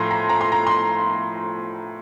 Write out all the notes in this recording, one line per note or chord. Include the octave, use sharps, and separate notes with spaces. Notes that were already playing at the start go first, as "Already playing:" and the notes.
Already playing: A2 F3 A#5 C6
A#5
A#5
C6
A#5
C6